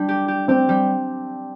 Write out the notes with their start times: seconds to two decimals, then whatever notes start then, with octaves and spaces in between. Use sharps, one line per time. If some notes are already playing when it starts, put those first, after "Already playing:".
Already playing: G3 D4
0.09 G4
0.28 G4
0.48 C4 G4
0.69 G3